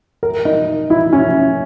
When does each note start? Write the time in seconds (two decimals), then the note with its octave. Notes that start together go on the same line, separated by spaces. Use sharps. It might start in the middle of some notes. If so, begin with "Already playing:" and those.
0.23 A#4
0.45 D#4
0.90 E4
1.13 C#4